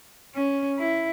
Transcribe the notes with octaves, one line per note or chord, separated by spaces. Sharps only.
C#4
E4